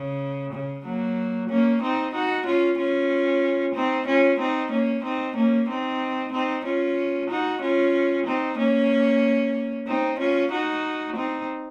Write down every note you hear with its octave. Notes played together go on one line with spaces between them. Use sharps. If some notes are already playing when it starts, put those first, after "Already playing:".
Already playing: C#3
C#3
F#3 A#3
A#3 C#4
C4 D#4
D#4 F#4
C#4 F4
C#4 F4
C4 D#4
C#4 F4
C4 D#4
A#3 C#4
C4 D#4
A#3 C#4
C4 D#4
C4 D#4
C#4 F4
D#4 F#4
C#4 F4
C4 D#4
A#3 C#4
C4 D#4
C#4 F4
D#4 F#4
C4 D#4